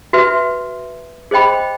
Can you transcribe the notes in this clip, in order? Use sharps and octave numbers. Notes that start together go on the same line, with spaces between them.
F#4 B4 E5
G#4 C5 D#5 G5 B5